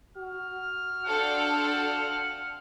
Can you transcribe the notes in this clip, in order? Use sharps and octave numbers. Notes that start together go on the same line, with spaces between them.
F#4 F6
C4 D4 F4 A4 F#5